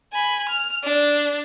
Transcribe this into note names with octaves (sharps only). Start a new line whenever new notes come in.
G#5 B5
F6
D4